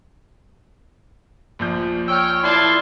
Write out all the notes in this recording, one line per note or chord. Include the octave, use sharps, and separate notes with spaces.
A#1 F3 G6
C#5 G5 E6 F6
E4 F4 D5 A5 C6